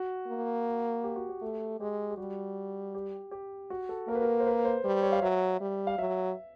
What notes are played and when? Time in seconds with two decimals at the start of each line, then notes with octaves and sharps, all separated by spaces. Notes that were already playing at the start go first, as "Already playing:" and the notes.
Already playing: F#4
0.27 A#3
1.04 G4
1.16 F#4
1.29 G4
1.41 A3
1.80 G#3 G4
2.10 G4
2.17 G3 F#4
2.95 G4
3.31 G4
3.70 F#4
3.89 A4
4.08 A#3 A#4
4.15 B4
4.22 A#4
4.40 C5
4.47 B4
4.59 B4
4.65 C5
4.85 G3 C5
5.03 C#5
5.12 F5
5.22 F#3 E5
5.61 G3
5.87 F5
5.98 F#3 E5